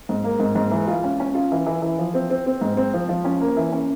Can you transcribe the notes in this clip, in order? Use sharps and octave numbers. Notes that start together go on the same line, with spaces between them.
G#2
A#3
G#2
G#2
E3
F4
C#4
C#4
F4
E3
E3
E3
F3
C4
C4
C4
G#2
C4
F3
F3
C#4
A#3
E3
C#4